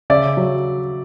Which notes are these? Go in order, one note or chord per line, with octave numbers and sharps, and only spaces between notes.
C#3 D5 E5
F#3